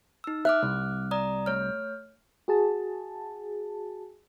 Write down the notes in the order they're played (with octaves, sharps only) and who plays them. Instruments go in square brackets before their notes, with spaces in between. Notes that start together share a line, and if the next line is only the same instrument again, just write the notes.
[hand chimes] D#4 E6
[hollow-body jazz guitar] E5 [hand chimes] D6 F6 F#6
[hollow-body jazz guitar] C2
[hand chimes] D5 A#5 D#6
A3 C#5 F6
[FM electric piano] F#4 G#4 A5